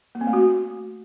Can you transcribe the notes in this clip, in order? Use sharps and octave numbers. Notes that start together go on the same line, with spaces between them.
A#3
C4
A3
F#4